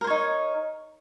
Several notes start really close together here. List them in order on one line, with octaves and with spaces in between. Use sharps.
A#4 C5 C#5 D#4